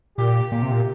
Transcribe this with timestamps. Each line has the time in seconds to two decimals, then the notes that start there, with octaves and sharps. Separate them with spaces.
0.18 A#2 G4
0.52 A#2
0.62 C3
0.72 A#2